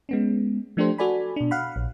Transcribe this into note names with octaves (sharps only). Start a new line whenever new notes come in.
G#3 B3 C#4
F3 A3 D4 G4 A4 C5
F#4 A4 D5 G#5 B5
B2 D4
F5 F#5 B5
A#1